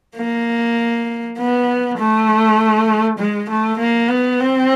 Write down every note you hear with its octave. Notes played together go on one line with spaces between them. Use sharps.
A#3
B3
A3
G#3
A3
A#3
B3
C4